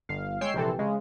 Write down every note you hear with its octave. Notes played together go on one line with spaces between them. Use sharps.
G1 F5
G#3 C#5 G5 E6 C7
A#1 C3 E3 C4 A4
C#3 G#3